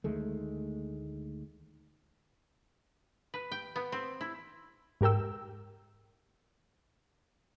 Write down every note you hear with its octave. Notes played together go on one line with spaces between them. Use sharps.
D2 D#3 G#3 A3
B4
G5
B3
C4
E4
G#2 G4 A#4 G5 E6